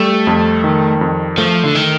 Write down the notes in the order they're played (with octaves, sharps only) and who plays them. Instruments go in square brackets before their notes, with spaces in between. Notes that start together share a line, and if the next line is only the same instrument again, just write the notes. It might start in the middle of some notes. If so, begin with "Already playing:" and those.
Already playing: [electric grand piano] G3 [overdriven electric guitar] A3
[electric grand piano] F2
D#3
F2
[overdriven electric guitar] F3 [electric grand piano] A3
[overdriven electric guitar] D3
D#3